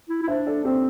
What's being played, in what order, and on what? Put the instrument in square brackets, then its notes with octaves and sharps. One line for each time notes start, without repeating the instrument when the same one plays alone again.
[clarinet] E4
E4
[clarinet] D4 [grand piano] C5 E5
[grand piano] A4 D5
[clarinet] C4 [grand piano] G4 C5